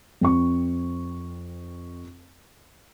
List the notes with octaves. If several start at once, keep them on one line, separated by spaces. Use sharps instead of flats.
F2 C4 C#6